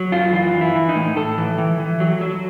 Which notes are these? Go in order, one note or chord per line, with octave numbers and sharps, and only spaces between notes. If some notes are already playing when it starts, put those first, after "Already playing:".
Already playing: F#3
F#2 F4
E3 F4
E3
E4
E3
D#4
A2
A2 A4
E3
E3
E3
F#3
F#3